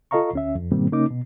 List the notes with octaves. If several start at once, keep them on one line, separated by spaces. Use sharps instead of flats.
F4 A4 D#5 F5 A#5 C#6
D2 C#4 E5
F2
G#2 B2 D#3 G3 A#3 C4
C#3 A#3 C#4 D#4 D6
B2